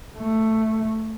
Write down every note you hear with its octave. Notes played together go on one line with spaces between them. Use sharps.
A3